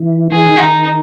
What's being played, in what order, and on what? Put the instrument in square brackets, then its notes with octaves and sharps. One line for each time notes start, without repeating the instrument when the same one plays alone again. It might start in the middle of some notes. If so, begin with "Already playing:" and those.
Already playing: [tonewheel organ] E3
[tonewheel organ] E3 [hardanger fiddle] G#4
[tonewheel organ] D#3
[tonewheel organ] D#3 [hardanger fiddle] D#4